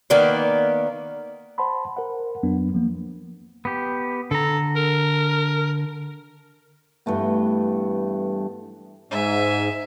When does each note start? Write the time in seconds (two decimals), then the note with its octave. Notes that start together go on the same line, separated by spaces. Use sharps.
0.10 D#3 A#3 B3 D5
1.58 C5 F#5 A5 B5 C6
1.97 A#4 C5 F#5
2.43 F2 F#3 B3 D4
2.74 F3 A#3
3.65 B3 G4
4.31 D3 A4 A#5
4.76 A#4
7.06 G2 E3 A3 B3
9.11 G#2 E5 G#5